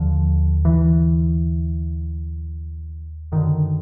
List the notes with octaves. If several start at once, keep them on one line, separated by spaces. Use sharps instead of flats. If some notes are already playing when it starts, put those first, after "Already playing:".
Already playing: D#2 D3 F3
E3
F#2 D3 D#3